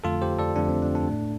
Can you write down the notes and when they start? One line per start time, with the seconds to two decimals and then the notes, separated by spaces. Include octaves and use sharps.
0.04 F2 D3 A3 F4 A4
0.22 G4 C5
0.39 A4 D5
0.56 F2 D3 A3 D4
0.69 C4
0.82 D4
0.95 D4
1.08 A2 A3